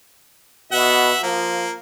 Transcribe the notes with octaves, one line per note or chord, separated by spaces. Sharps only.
B2 E5 F#5
F3 A#3